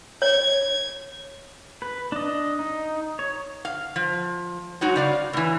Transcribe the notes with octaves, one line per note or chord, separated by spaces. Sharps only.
C#5 G#6
B4
D4 D#5
D#4
C#5
F5
F3
F#3 G#3 D#4 F#4
C#3 D5 F5
A2 E3